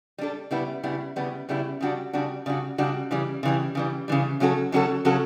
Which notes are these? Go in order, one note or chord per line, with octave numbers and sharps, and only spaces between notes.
G3 D4 A4
C#3 G3 B3 E4
C#3 G3 B3 E4
C#3 G3 B3 E4
C#3 G3 B3 E4
C#3 G3 D4 F#4
C#3 G3 D4 F#4
C#3 G3 D4 F#4
C#3 G3 D4 F#4
C#3 E3 G3
C#3 E3 G3
C#3 E3 G3
C#3 E3 G3
C#3 F#3 C#4 F#4 A4
C#3 F#3 C#4 F#4 A4
C#3 F#3 C#4 F#4 A4